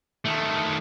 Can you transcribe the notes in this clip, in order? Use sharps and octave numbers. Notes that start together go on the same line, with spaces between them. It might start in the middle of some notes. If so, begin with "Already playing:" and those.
D#3 A3